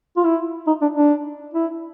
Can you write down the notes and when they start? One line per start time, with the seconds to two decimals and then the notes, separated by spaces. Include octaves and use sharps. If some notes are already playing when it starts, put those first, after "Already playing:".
0.17 F4
0.24 E4
0.67 D#4
0.82 D4
0.96 D4
1.54 E4